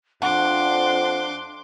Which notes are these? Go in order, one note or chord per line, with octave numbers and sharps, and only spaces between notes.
F2 D4 F#5 C6 D6